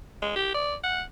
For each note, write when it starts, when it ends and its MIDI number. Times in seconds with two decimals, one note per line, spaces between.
0.22 0.35 56
0.36 0.53 67
0.54 0.75 74
0.84 1.02 78